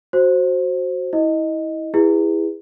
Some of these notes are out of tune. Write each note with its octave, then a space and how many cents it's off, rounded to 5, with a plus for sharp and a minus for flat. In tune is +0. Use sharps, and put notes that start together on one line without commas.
F#4 +0 C5 +10
E4 -25 D#5 +0
E4 +0 G#4 -35 B4 +0